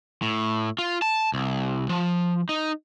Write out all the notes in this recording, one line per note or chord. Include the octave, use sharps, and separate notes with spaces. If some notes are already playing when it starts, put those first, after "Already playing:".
A2
F4
A5
C2
F3
D#4